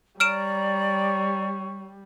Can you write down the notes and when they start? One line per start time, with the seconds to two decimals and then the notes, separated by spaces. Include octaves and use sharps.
0.20 G3 C#5 D5 A#5 F6 D7 E7